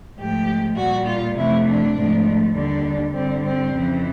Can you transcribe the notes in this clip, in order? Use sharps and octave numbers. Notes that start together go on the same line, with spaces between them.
G#2 F3 A3 G4
A#2 G3 F#4
F4
F2 C3 E3 A3 E4
D4
G#2 F3 A3
D#2 D3 G3 D4
G2 D3 G3 C4
C4
F2 C#3 E3